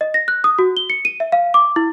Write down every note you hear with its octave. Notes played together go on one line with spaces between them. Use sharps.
D#5
A#6
F#6
D#6
F#4
G7
C#7
D#7
E5
F5
D6
E4